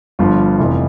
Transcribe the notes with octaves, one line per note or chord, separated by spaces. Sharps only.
G1 G2 F3 F4
F1 F2 C3 E3